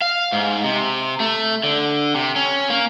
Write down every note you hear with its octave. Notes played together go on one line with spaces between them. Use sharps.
F5
G#2
C3
A3
D3
C3
C#4
A#3